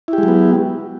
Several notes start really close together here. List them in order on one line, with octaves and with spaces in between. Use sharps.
E4 G4 G#3 F#3 B3